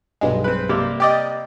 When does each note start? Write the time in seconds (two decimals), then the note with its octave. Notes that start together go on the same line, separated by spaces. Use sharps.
0.21 B1 G2 G#3
0.44 C4 B4
0.69 C3 G3 A#3
1.00 G4 D5 D#5